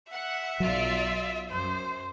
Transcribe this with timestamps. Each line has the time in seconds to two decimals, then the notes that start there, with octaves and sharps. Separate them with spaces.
0.12 E5 F#5
0.60 B1 F#3 F4 D5
1.50 F#2 C5